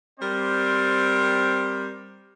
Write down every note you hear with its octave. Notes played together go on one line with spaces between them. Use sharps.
G3 C4 A#4 C5 D5